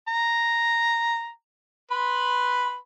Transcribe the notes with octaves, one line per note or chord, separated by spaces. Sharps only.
A#5
B4 B5 C6